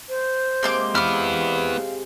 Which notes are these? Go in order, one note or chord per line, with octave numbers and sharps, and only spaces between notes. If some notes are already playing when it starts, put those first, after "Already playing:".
C5
C3 G#3 A#3 C6 D6
B3 E4 F5 D6 F6